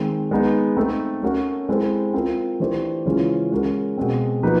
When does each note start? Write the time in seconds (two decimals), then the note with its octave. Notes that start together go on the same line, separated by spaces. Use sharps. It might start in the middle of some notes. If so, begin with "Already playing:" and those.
Already playing: D#3 G#3 C4
0.31 G#3 B3 D#4
0.77 A3 C4 D#4
1.23 A3 C#4 F#4 A#4 C#5
1.69 G#3 C4 E4 A4 C5
2.14 C4 F4 A#4
2.60 E3 A3 D4 G4 C5
3.06 C#3 E3 G#3 C#4 F4
3.52 G#3 C#4 F#4 A#4
3.98 B2 G#3 C4
4.43 F3 A#3 D#4 F#4 B4